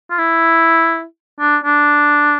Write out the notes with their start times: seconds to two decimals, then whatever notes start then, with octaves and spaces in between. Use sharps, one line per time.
0.11 F4
0.18 E4
1.40 D4
1.64 D4